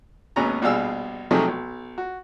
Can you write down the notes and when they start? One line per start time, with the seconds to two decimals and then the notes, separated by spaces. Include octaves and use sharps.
0.36 G#1 D#2 B3 C#4 G#4 A#5
0.62 A#1 B2 G3 G#4 F5 E6
1.31 C3 F3 F#3 A3 D#4 G#4
1.48 B1
1.98 F#4